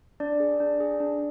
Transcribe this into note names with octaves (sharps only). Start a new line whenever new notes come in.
D4 D5
G#4
D4
G#4
D4